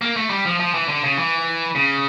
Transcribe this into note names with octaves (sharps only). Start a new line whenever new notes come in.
A#3
A3
G3
F3
F3
E3
D3
C#3
E3
C#3